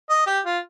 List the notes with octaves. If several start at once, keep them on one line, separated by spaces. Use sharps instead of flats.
D#5
G4
F4